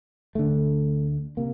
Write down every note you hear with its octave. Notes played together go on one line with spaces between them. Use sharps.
D2 D3 A3
C3 A#3